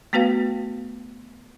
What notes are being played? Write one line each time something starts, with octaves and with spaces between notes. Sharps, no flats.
A3 B3 F#4 B4 F5